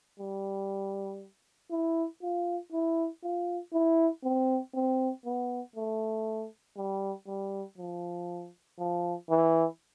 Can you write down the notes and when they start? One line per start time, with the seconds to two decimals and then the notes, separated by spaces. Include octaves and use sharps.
0.20 G3
1.71 E4
2.22 F4
2.72 E4
3.23 F4
3.73 E4
4.24 C4
4.75 C4
5.25 B3
5.76 A3
6.77 G3
7.27 G3
7.78 F3
8.79 F3
9.30 E3